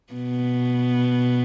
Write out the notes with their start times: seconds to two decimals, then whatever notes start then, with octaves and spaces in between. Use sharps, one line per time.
0.13 B2 B3